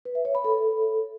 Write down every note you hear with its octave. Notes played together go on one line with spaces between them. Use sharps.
B4
E5
C#5
B5
A4